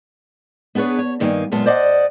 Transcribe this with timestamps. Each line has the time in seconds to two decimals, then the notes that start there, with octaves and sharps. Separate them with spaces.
0.75 B3 D4 G#4 B4 C#5
0.99 C#5
1.20 G2 D#3 A#3 F5 G#5
1.52 F#2 A#2 G#3 B3 F4 A5
1.66 C5 D5 D#5 F5 F#5